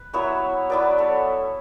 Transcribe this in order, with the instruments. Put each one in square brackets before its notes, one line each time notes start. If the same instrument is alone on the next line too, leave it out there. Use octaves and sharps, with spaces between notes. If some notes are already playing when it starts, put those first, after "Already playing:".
Already playing: [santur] B4
F#3 B3 E4 C#5 E5
F#3 B3 E4 B4 D5
A4 C#5